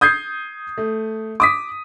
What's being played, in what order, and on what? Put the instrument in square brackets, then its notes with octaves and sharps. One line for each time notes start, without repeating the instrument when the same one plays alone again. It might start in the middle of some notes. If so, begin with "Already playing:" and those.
[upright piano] D#6 G6 G#6 C7
A3
D6 D#6 B6